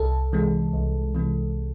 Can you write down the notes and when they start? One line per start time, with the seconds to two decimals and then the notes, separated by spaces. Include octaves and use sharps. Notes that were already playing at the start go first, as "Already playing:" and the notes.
Already playing: C2 A4
0.33 C3 E3 G#3
0.73 C2
1.15 C3 E3 G#3